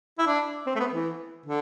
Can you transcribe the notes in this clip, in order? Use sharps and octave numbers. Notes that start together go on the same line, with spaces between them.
E4
D4
C4
A3
B3
E3
D3